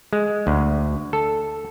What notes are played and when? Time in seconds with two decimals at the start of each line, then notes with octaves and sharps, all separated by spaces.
0.13 G#3
0.47 D2
1.13 A4